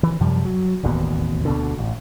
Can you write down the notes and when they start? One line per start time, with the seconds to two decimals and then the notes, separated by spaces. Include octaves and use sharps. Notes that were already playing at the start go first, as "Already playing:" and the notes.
0.03 E3
0.21 F#2 C3 F3 G3
0.45 F#3
0.84 E1 A1 D#2 B2
1.45 D2 B2 D3
1.79 A1